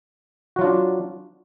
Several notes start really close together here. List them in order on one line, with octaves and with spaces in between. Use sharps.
F#4 F#3 F4 D4